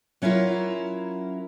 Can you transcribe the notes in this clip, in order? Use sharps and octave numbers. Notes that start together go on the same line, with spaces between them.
F#3 C#4 E4 F4 A#4